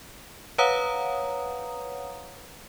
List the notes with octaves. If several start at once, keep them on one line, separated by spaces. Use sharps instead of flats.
B4 C#5 F5 F#5 A#5 D#6